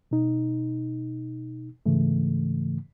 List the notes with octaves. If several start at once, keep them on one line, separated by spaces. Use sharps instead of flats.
B2 D#4
G#2 C#3 E3 A3